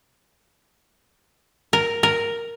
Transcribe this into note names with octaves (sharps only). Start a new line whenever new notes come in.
A#4
A#4